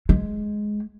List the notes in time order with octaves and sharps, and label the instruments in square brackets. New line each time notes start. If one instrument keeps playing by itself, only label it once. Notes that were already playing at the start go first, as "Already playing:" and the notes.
[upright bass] G#3